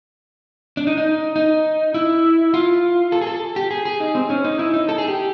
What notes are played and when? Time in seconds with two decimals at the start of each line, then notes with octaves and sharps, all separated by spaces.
0.77 D4
0.87 D#4
0.97 D#4
1.36 D#4
1.94 E4
2.54 F4
3.12 A4
3.22 G#4
3.27 A4
3.56 G4
3.71 G#4
3.85 G#4
4.00 D#4
4.15 C4
4.30 C#4
4.44 D#4
4.59 E4
4.74 D#4
4.89 A4
4.98 G#4
5.08 G4